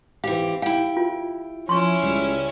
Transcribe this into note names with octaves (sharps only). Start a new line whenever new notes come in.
E3 C4 G4 F5
E4 F5 G5
F4
F3 C#4 E4 C6 C#6
C#2 G3